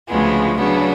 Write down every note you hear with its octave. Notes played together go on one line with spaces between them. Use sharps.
D2 C#3 F3 G#3 B3
C#3 F#3 B3 D4